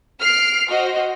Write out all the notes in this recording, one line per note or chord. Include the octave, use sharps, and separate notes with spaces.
F6 C7 D7
F#4 C5 D#5